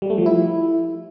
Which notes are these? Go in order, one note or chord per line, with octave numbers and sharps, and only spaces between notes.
G3
A3
F3
E4